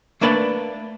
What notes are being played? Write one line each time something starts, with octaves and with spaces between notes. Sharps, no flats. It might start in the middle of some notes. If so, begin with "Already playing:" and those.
A3 A#3 D4 B4 D5 A5